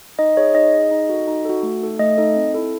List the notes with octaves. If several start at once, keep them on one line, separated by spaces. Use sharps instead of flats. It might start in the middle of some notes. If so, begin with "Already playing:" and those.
D#4 D#5
G#4 C#5
D#4 D#5
G#4
D#4
F#4 A4
D#4
F#4 A4
A3
D#4 A4
A3 D#5
D#4 A4
C4
E4 A4